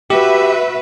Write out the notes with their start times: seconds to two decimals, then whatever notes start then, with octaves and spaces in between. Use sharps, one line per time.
0.10 F#4 G4 B4 E5